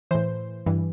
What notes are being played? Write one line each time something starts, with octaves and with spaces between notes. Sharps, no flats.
A2 E3 C5
G2 E3